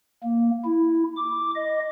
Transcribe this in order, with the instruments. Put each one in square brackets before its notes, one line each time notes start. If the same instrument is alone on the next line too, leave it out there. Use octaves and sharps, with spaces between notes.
[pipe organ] A#3
E4
D6
D#5